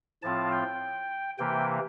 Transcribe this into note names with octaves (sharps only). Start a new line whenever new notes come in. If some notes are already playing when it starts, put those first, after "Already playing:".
A2 F3 C4 F4 A5
G5
C3 E3 A#3 G5